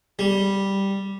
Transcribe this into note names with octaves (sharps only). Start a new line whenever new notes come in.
G3